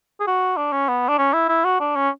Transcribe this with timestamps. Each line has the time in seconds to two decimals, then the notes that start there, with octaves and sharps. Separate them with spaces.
0.20 G#4
0.27 F#4
0.57 D4
0.72 C#4
0.88 B3
1.09 D4
1.18 C#4
1.33 E4
1.48 E4
1.65 F#4
1.80 D4
1.96 C#4